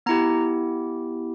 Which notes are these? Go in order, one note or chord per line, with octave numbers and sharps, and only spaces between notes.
B3 E4 G4 A#5